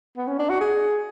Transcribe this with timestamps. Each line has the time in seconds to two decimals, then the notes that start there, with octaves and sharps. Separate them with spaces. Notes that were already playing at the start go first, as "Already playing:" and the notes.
0.17 B3
0.28 C#4
0.39 D4
0.50 F#4
0.61 G#4